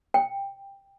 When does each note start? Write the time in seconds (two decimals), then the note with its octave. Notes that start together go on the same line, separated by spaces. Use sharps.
0.14 G5